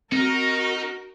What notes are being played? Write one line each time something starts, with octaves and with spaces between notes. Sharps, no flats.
C4 D#4 F#4 A#4